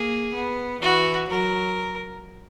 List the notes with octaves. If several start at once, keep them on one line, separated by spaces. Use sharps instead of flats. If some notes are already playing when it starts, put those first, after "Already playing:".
Already playing: A#3 G#4
B3
E3 F#4
F#3 A#4